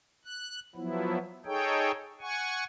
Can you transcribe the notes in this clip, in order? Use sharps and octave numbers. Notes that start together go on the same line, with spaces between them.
F#6
F3 F#3 B3 E4
D#4 G#4 A4 C#5 G5
F#5 G#5 C#6